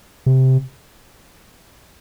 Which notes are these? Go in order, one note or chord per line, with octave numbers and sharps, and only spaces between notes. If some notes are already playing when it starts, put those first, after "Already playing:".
C3